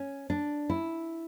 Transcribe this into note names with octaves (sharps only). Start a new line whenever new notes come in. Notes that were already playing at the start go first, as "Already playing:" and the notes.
Already playing: C#4
D4
E4